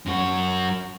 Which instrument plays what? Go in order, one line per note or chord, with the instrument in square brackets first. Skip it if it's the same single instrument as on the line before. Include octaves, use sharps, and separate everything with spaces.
[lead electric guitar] F#2 F#4